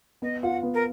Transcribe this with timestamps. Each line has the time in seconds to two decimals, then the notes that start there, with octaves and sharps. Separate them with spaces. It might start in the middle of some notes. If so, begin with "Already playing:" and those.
0.22 B3 D#5
0.42 F4 F#5
0.63 B3
0.74 A#4